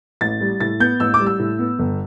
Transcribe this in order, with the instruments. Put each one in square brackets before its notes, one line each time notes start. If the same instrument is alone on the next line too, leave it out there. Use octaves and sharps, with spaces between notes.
[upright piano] A1 A6
G3
A2 A6
B3 G6
A1 E6
D6
G3
E6
A2
B3
G1